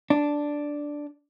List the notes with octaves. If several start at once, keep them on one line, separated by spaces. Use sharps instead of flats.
D4